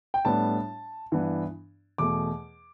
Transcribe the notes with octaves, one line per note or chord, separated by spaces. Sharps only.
G5
A2 G3 B3 D4 A5
G2 E3 B3 D4
E2 B2 A3 D6